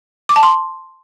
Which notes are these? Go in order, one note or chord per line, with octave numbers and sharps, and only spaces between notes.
D6
A5
C6